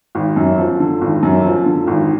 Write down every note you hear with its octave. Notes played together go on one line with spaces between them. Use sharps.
G#1
F#2
F3
D3
G#1
F#2
F3
D3
G#1